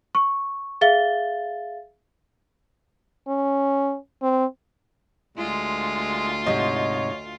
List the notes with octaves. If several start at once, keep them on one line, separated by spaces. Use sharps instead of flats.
C#6
G#4 E5 F5 A6 G7
C#4
C4
D2 G#3 F4
G#2 C3 C#5 D#5